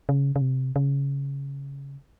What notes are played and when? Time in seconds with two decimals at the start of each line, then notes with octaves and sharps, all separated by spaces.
0.09 C#3
0.36 C#3
0.41 C3
0.76 C#3